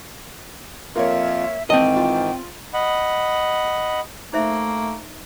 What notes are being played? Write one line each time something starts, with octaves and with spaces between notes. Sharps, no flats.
F2 A#3 F4 A#4 C#5 E5
G#2 D#3 E3 C4 D#5 G5 A5
F4
D#5 F#5 B5
A3 A#3 D#4 C5 E5